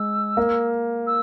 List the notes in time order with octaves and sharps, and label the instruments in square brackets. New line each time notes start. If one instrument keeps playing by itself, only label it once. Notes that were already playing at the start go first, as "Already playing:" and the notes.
Already playing: [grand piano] G#3 [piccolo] E6
[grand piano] A#3
[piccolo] E6